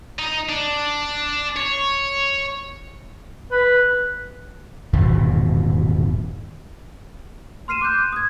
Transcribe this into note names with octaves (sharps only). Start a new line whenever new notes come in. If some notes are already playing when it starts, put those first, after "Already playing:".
D#4
D4
C#5
B4
D#1 G#1 E2 B2
C6 F6 C7 D#7 E7
D6 F#6 G6
D#6 G#6